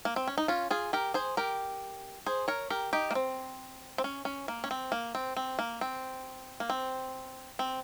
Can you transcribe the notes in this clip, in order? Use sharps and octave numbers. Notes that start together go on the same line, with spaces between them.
A#3
C4
C#4
D#4
C#4 F4
F4 G#4
G4 A#4
G#4 C5
G4 A#4
G#4 C5
A#4 C#5
G4 A#4
D#4 G4
A#3
C4
C4
C#4
C#4
A#3
C#4
C4
A#3
C4
C4
A#3
C4
A#3
C4
C4